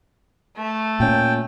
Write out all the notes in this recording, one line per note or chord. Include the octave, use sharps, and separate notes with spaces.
A3
A#2 C#4 G5